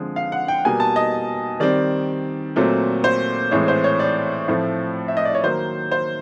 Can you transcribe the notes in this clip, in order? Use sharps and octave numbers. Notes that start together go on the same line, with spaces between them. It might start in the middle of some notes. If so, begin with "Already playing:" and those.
Already playing: D3 F3 G#3 C4
F5
F#5
G5
B2 G3 A#3 G#5
A5
D#5
D#3 G3 C4 D5
A#2 F#3 A3 C4
C5
A2 E3 G#3 C4 C#5
C5
C#5
D5
A2 F3 A3 C4
E5
D#5
D5
C#5
D#3 F#3 A#3 C5
C5